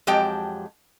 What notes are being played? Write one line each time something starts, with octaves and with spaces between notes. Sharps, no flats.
F2 F#3 G#3 G4 G5 A5